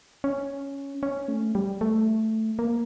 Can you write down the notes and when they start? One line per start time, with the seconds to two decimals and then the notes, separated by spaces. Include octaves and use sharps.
0.24 C#4
1.03 C#4
1.28 A3
1.55 G3
1.81 A3
2.59 A#3